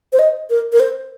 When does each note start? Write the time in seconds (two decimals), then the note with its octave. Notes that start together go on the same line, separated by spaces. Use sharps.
0.13 C5
0.19 D#5
0.50 A#4
0.73 A#4
0.80 C5